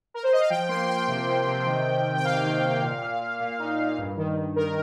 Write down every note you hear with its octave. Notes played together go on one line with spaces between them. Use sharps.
A#4
C5
D#5
F5
F3 G5
A#3 C6
A#3 G5
C3
F3
C3
D#3
D#3
D#3
G5
A#3 F5
D#3
A#3
A#2
A#2
A#2
A#2
D#4
A#2
G2
D#3
D#3
D#3 A#4